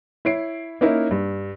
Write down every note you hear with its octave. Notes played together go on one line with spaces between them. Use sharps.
E4 C#5 C7 D7
A#3 C#4 D#4 E4 A#4
G2